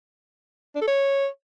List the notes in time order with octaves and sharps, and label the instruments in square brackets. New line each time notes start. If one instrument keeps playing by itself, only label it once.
[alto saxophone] D4
A4
C#5